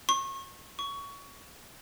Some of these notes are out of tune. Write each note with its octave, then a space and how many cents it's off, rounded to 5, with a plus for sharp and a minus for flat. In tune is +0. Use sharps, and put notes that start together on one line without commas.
C#6 -30
C#6 +20